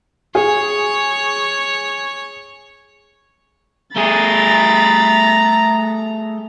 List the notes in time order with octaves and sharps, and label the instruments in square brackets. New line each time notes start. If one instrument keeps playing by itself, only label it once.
[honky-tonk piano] G#4 [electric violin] C#5
[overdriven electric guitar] A3 G#4 [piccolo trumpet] A#5 [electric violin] B5 A6